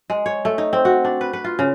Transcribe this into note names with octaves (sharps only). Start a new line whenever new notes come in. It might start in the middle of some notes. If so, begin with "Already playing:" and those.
G#3
C#5
A3
D#4
C4
F#4
D4
B4
B4
F4
C#3